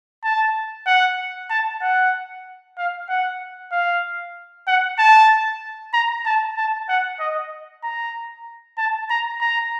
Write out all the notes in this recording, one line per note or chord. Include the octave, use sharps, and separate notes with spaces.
A5
F#5
A5
F#5
F5
F#5
F5
F#5
A5
A#5
A5
A5
F#5
D#5
A#5
A5
A#5
A#5